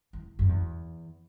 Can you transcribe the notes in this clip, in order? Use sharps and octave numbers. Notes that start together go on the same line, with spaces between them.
E2
F#2
E2